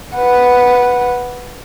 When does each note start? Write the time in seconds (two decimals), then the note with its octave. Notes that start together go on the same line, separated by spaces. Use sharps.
0.17 B4 F#5